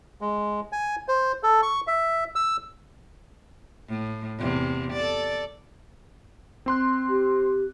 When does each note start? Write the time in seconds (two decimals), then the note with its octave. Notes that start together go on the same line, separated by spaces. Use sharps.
0.21 G#3
0.72 G#5
1.08 C5
1.43 A4
1.63 C#6
1.87 E5
2.35 E6
3.89 A2
4.38 E2 C3
4.93 A4 D5
6.66 C4 C6 F#6
7.09 G4